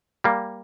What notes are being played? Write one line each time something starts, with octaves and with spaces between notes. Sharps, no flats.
G3 A#3